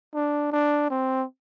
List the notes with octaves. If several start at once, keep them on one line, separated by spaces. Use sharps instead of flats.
D4
D4
C4